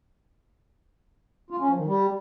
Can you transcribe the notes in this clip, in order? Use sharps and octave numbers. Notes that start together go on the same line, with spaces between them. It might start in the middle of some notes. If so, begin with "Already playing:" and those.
F4
C#4
F3
D#3
G3